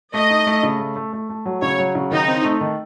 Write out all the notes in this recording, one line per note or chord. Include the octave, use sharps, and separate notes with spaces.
A3 D#5
D#4
A3
C#3
A3
A3
A3
A3
F#3
C#3 C#5
F#3
C#3
D#3 D#4
C4
A3
D#3